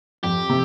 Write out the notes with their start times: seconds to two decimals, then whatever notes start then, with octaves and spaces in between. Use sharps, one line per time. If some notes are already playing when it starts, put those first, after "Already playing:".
0.24 F2 G4
0.49 C3